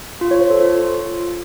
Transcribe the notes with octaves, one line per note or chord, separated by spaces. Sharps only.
F4
C#5
C5
A4
F4